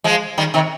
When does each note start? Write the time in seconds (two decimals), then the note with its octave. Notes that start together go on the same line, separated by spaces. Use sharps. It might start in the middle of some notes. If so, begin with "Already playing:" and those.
0.04 F3 G#3
0.38 D#3 G3
0.54 C3 D#3